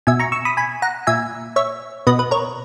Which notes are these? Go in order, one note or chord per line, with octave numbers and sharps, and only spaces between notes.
B2 E5 G#5
A#5 C#6
C#6 E6
B5 D#6
G#5 B5
F#5 A#5
A#2 E5 G#5
C#5 E5
B2 B4 D#5
B4
A#4 C#5